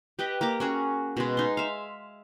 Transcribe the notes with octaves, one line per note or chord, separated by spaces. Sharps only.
G4 B4 D#5 G5
A#3 G4 A#5 D6
C#4 F#4 G#4
B2 G#3
D#4 C6
E5 F5